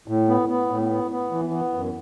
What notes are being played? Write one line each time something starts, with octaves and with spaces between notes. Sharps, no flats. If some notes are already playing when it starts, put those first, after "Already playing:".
A2
B3
B3
A2
B3
B3
E3
B3
F#2